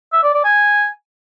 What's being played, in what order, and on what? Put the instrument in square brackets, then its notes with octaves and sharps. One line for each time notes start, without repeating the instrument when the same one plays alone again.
[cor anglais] E5
D5
D5
G#5